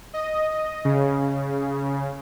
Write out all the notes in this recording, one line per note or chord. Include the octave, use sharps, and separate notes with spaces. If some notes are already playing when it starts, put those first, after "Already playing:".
D#5
C#3